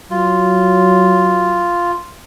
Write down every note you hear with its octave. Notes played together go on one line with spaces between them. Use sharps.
F#3 F4